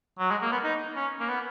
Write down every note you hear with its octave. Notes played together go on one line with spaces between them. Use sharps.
F#3
G#3
A#3
B3
D#4
C#4
A#3
B3